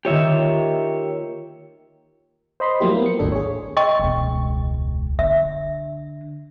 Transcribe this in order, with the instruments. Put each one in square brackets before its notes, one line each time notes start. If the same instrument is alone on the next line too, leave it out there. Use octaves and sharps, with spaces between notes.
[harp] D#3 A#3 F4 [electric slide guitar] G4 C#5 E5
[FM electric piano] C5 D#5 B5 C6
F3 F#3 A3 A#3 E4 G4
A#3 B3
C#7
A1 D#2 A2 D4 A4
G#4 C#5
[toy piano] D#5 G5 C#6
[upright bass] E1 C#2
[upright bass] D3 [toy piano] E5